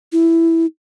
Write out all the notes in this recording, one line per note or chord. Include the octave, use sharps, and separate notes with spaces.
E4